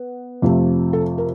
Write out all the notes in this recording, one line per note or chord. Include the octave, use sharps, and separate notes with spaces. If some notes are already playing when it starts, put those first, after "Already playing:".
Already playing: B3
F2 C3 F3 A3 C4
A4
A#4